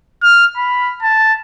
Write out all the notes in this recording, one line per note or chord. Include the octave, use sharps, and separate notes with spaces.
F6
B5
A5